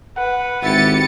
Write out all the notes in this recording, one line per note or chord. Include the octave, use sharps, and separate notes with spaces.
B4 F#5
G#1 E4 G4 A6 C#7